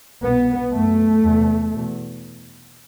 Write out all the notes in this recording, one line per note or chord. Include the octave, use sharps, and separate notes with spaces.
C2 B2 B3
F#2 A3
E2 C3
E2 B2